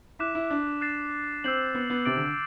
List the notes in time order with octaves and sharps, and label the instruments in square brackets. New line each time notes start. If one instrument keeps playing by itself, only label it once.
[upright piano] E4 [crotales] D6 F#6 B6 E7
[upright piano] E4
D4
[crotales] F#6 A6 C7 E7
[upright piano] C4 [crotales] E6 G6 C7 F#7
[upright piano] B3
B3
[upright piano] C3 [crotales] D6 A6 D7 F#7
[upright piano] D3